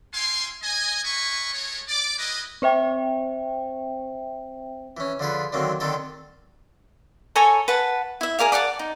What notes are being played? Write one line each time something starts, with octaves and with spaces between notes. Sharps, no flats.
E4 F5 G5 G#5 C6
D#5 G#5
D4 D#5 E5 G#5 B5 C#6
G#3 A3 C#5
D5 D6
E4 G4 G#4 B4 D#5
C4 C5 E5 G5
E3 C#4
D3 F3 G#4 B4
D3 D#3 F#3 A#3 C4
D3 D#3 C4 D#4 A4
A4 C#5 G#5 A#5
B4 F#5 A5
E4 E5
G#4 A#4 D5 F5
D5 F#5 G#5 A5
D#4